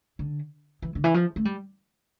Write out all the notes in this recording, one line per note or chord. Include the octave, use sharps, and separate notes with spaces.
D3
E3
D3
E3
F3
A3
G3